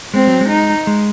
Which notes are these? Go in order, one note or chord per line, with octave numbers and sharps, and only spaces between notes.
G#3 C4
F#3
G#3
D#4
G#3